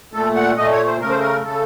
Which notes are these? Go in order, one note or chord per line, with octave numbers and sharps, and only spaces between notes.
A#2 A3 A4
F#5
A#2 A3 D#5
C#5
C5
C#3 A3 A#4
C5
A#4
C#3 A3 A4